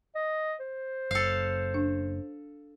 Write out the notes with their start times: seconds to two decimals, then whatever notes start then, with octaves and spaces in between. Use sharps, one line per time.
0.15 D#5
0.60 C5
1.11 F#1 A4 F5
1.74 D4